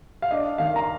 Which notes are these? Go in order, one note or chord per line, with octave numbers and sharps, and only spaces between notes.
F5
D4 D#5
D#3 F5
A#5